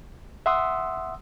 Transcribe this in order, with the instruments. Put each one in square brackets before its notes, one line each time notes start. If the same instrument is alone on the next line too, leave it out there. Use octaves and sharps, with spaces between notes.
[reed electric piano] E5 F#5 C6 D#6 E6